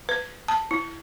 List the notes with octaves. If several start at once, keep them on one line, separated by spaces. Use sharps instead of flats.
B4
A5
E4